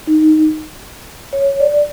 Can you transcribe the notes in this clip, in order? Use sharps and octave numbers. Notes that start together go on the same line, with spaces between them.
D#4
C#5
C#5
D5